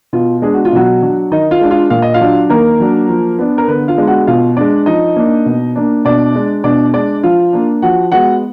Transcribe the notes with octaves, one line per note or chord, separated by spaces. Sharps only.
B2 F4
G#3 B3 D4 G#4
F#4
F4
B2 F#3 F#4
F#3 D4
D#3 D#4 D#5
F4 F5
G#3 D4
F4 F5
A#2 F5
D#5
F4 F5
F#3 D4
D#3 A#3 A#4
F#3 D4
F3
B3 D4
A#4
D3 B3 B4
F4 F5
G#3 B3 D4
F#4 F#5
B2 F4 F5
G#3 D4 D5
F3 D#4 D#5
A#3 D4
B2
A#3 D4
B2 D4 D5
G#3 D4
B2 D4 D5
G#3 D4 D5
F3 F4 F5
A#3 D4
F3 F#4 F#5
G#3 B3 F#4 F#5